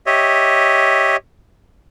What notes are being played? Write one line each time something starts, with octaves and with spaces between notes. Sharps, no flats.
G4 C#5 D#5 E5